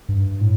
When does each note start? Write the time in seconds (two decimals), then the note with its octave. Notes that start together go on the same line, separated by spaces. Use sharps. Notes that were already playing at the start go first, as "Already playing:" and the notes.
0.09 G2
0.41 A2